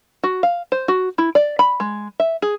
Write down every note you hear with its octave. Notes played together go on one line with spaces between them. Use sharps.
F#4
F5
C5
F#4
E4
D5
B5
G#3
E5
G#4